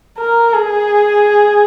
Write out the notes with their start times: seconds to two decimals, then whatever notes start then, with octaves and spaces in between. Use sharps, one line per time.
0.19 A#4
0.54 G#4